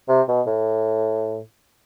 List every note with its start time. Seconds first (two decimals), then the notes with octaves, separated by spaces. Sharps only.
0.08 C3
0.28 B2
0.46 A2